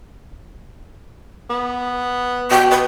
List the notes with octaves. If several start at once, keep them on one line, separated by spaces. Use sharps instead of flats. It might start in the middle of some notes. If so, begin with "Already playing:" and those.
B3
B2 G5
B2 B4